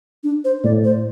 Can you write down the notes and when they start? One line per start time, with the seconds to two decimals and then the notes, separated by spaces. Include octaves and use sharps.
0.24 D4
0.45 C5
0.64 A2 D5
0.84 C5